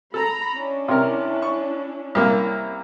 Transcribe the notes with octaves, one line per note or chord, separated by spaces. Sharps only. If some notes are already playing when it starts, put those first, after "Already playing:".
A4 A#5 B5
C#4 D4 E4
C3 A#4
C#6
C2 A#3